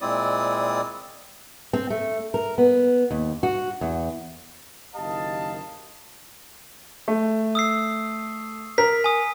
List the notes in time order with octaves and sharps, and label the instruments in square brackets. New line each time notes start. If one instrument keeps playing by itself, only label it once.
[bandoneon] A#2 G#3 C4 E4 D5 D#6
[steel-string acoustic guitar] C4
A3
A#4
B3
D#2
F#4
E2
[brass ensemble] F#1 D#3 G4 D#5 F5 A5
[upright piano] A3
[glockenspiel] D#6 E6 C7
[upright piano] A#4 [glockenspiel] B6
[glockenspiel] G#5 D#6